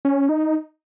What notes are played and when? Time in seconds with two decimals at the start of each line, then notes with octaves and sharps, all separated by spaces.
0.05 C#4
0.29 D#4